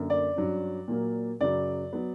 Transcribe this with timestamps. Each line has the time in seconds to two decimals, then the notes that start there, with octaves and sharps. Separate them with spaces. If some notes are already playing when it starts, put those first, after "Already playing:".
Already playing: F#2 D3 A#3
0.10 D5
0.36 G2 F#3 C#4
0.88 A#2 F#3 A#3
1.40 F#2 C#3 F#3 D5
1.93 F#3 B3